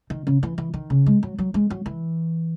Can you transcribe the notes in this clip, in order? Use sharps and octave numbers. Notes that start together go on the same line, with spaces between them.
D#3
C#3
E3
E3
D#3
C#3
G#3
F#3
F#3
G#3
F#3
E3